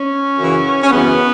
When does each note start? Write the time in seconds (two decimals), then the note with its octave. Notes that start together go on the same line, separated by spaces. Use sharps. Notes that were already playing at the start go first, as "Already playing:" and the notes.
Already playing: C#4
0.38 F#2 C#3 E3
0.83 C#4
0.91 F#2 C#3 E3 B3